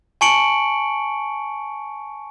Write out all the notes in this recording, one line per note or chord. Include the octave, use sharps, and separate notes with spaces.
G#5 A5 C#6 C#7 D7 F#7